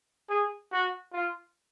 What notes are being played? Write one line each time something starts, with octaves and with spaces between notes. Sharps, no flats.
G#4
F#4
F4